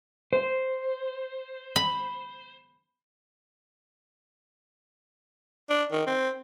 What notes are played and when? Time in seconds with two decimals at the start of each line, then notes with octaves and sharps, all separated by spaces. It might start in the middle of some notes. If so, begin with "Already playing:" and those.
0.33 C5
1.76 B5
5.70 D4
5.92 D#3
6.07 C4